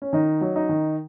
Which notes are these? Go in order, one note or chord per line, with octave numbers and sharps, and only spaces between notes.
C#4
D#3 D#4
F#3
D#4
D#3